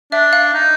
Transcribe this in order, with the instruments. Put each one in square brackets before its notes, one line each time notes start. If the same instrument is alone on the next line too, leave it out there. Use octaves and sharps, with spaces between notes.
[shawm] D4 [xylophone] E5
[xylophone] F5
[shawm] D#4